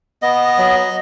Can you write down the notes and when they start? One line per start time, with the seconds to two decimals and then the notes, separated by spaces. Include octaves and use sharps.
0.22 B3 D#5
0.58 F#3